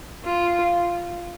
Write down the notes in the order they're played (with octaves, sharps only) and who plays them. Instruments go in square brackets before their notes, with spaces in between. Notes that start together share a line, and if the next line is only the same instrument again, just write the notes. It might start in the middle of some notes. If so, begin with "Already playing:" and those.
[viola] F4